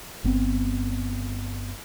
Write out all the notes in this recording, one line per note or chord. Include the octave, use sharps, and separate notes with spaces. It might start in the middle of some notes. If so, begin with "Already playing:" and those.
G1 B3 C4